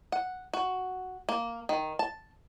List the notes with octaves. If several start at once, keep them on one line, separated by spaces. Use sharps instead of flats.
F#5
F#4
A#3
D#3
A5